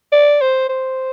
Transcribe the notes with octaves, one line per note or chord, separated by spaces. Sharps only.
D5
C5
C5